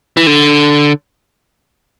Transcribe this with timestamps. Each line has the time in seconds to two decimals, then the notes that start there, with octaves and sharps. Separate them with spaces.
0.17 E3
0.27 D3